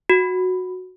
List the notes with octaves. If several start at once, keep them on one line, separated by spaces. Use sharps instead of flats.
F#4